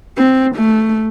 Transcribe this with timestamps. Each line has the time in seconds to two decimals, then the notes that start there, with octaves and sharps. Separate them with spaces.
0.18 C4
0.56 A3